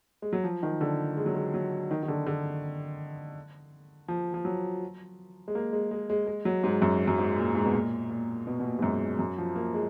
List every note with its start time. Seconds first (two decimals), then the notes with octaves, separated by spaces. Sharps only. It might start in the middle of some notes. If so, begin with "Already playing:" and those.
0.22 G#3
0.33 F#3
0.44 F3
0.63 D#3
0.81 D3
1.17 G#3
1.26 F#3
1.34 G#3
1.54 F#3
1.91 D#3
2.03 D#3
2.08 D3
2.26 D3
4.08 F3
4.34 F3
4.45 F#3
5.48 G#3
5.55 A#3
5.73 G#3
5.91 G#3
6.10 G#3
6.27 G#3
6.45 F#3
6.64 G#2
6.82 F#2
7.08 F#2
7.18 G#2
7.36 A#2
7.55 G#2
7.65 B2
7.74 A#2
8.11 A#2
8.47 B2
8.60 B2
8.64 A#2
8.79 G#2
8.82 F#2
9.19 F#2
9.38 F3
9.56 A#3
9.74 G#3